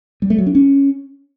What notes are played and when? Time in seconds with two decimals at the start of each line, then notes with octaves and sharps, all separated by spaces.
0.22 G3
0.30 A3
0.38 F#3
0.47 D4
0.55 C#4